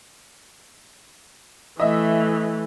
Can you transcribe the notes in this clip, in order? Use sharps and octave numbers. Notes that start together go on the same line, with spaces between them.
E3 A3 D#5 E5